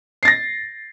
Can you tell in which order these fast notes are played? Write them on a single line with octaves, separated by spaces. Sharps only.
C7 A6 A#6